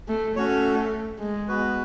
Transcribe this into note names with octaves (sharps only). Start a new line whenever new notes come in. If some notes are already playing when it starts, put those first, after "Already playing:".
A3
A3 C#4 F#4 C#5
G#3
B3 F#4 B4